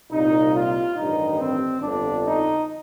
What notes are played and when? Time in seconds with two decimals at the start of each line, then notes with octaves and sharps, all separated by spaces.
0.11 C2 A#2 D#4
0.54 F4
0.96 A1 G2 D#3 D#4
1.39 C4
1.81 G1 F2 D3 D4
2.23 D#4